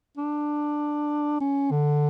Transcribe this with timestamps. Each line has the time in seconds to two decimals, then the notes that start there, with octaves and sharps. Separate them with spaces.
0.17 D4
1.40 C#4
1.71 D3